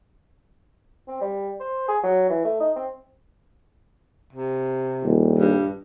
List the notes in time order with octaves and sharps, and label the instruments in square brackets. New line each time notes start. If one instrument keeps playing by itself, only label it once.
[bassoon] C4
G3
C5
G#4
F#3
E3
A3
D#4
C4
[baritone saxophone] C3
[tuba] D#1
[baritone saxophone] G2